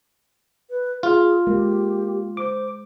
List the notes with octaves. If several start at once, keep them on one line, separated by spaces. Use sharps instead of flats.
B4
F4 G#4
G#3 A#3 G4
C5 D6